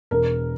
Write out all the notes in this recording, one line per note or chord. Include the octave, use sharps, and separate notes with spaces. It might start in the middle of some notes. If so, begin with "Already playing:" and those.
E1 A#4